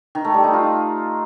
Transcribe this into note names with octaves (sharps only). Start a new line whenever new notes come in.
D#3
A3
G3
D#4
F4